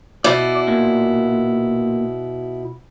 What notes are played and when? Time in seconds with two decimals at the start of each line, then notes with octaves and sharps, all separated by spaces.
0.24 B2 E4 D5
0.68 A#2